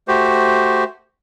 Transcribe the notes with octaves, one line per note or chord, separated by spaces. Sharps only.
A3 F#4 G4 C5